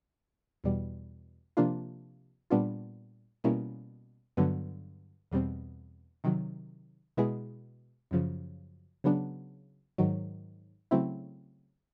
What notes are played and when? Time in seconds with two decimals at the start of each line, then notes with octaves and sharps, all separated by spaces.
0.64 E2 B2 G3
1.57 C3 F3 A#3 D4 F4
2.50 A#2 G3 B3 D4 F4
3.44 B2 G3 A#3 C#4 E4
4.37 G2 D3 F#3 B3
5.31 E2 B2 G3 C4
6.24 C3 D#3 F#3
7.17 B2 G#3 B3 E4 G#4
8.11 F#2 C#3 F3
9.04 C#3 F#3 B3 D4
9.98 G#2 D#3 F#3
10.91 C#3 F#3 A3 C4 E4